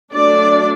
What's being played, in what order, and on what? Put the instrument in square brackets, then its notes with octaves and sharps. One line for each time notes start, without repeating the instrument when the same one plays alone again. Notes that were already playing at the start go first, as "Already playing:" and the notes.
[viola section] F#3 A3 D4 D5